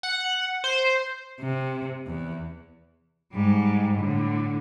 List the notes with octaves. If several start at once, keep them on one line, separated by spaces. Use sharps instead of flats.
F#5
C5
C3
E2
G#2 G3
A2 D3